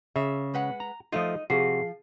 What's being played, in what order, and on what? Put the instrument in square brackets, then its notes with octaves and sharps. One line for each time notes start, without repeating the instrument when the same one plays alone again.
[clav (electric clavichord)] C#3 [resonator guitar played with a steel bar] E5
[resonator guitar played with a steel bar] G#3 B4 F#5
[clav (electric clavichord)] A#5
[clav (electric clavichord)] F3 A3 F4 [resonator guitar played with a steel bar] D#4 D#5
[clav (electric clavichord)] C3 F#4 [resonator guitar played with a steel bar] F3 [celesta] G#4 C7